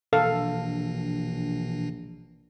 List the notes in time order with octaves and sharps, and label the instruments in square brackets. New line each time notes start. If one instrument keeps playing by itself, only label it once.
[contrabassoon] A#1 [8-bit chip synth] B2 E3 D4 [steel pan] A4 F5